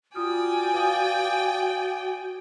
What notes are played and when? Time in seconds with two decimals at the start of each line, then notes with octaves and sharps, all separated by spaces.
0.15 F4 F#4 D5 G5 G#5 D#6 F6
0.73 B4 F5 D#6